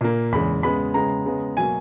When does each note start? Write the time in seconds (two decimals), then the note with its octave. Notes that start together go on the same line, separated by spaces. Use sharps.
0.01 A#2 A#3
0.32 E2 C#3 G#3 B5
0.63 C#3 G#3 B3 B5
0.94 C#3 G#3 B3 A#5
1.26 C#3 G#3 B3
1.57 B2 F#3 A#3 G#5